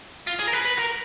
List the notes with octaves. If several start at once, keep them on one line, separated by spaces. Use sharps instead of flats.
F4
G#4
A#4
B4
B4
A#4